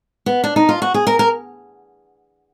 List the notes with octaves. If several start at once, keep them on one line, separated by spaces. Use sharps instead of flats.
B3
D4
D#4
F4
F#4
G#4
A#4
A#4